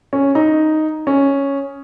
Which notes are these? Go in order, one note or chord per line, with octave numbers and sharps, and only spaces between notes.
C#4
D#4
C#4